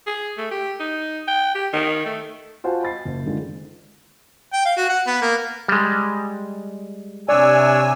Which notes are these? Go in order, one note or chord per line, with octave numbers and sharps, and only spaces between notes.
G#4
A3
G4
D#4
G5
G4
D#3
A3
F4 F#4 C5 F#5 G#5 A5
D#5 B5 A6 C7
F#1
D3 D#3 G#3 F4
G5
F5
F#4
F#5
B3
A#3
G3 G#3
C3 D4 C#5 D5 G#5 E6